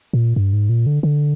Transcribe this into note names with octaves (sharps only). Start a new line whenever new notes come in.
A#2
G2
G#2
A#2
D3
D3